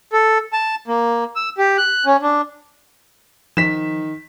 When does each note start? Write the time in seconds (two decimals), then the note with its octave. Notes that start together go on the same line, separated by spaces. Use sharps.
0.13 A4
0.53 A5
0.88 A#3
1.36 E6
1.58 G4
1.78 F#6
2.06 C#4
2.22 D4
3.57 D#3 F3 B6 E7